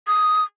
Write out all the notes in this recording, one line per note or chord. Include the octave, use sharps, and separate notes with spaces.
D#6